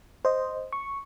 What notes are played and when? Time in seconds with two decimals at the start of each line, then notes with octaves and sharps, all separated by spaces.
0.25 C5 D#5
0.73 C#6